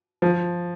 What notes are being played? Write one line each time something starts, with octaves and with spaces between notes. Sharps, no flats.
F3